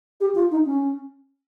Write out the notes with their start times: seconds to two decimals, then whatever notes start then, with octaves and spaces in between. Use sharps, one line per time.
0.20 G4
0.34 F4
0.51 D#4
0.65 C#4